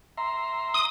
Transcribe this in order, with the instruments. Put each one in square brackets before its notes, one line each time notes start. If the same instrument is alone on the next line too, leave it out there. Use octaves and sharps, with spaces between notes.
[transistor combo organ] E5 A#5 C6
[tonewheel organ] D#6